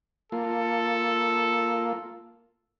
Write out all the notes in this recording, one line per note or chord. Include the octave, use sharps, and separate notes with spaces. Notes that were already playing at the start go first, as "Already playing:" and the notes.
A#3 F4 A4